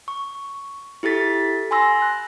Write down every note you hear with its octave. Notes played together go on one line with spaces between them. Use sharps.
C#6
E4 G4 A4 A6 B6
G#5 B5 C6 E6 A#6
F#6